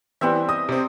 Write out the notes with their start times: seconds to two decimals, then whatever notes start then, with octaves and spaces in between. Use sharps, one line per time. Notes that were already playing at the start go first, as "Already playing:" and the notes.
0.21 E3 G3 B3 C4 E5
0.49 D#5 D#6
0.69 C3 C4